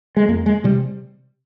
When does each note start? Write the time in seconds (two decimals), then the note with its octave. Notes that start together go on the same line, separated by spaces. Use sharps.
0.17 G#3
0.28 F2 A#3
0.46 G#3
0.64 C3 G3